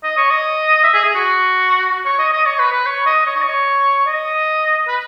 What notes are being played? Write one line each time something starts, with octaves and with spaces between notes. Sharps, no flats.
D#5
C#5
D#5
E5
G#4
G#4
F#4
C#5
D#5
D#5
C#5
B4
B4
C#5
D#5
C#5
D#5
C#5
D#5
B4